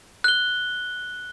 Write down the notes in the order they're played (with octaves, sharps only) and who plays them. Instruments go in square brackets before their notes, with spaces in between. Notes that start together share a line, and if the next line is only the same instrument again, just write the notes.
[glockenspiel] F#6 G7